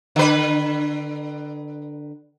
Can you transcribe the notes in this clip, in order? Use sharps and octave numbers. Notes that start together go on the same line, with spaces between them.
D3 B4